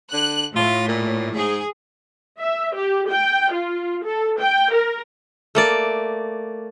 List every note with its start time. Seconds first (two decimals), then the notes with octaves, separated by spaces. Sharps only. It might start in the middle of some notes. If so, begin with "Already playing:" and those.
0.13 D3 F#6
0.56 A2 F4
0.88 A#2
1.37 G#2 G#4
2.40 E5
2.75 G4
3.09 G5
3.52 F4
4.04 A4
4.39 G5
4.73 A#4
5.55 A3 A#3 D5